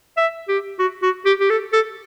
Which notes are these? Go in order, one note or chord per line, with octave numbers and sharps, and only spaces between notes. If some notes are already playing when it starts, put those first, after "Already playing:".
E5
G4
F#4
F#4
G4
G4
A4
A4